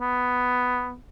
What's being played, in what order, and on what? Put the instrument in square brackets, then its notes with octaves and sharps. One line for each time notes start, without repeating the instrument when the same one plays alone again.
[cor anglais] B3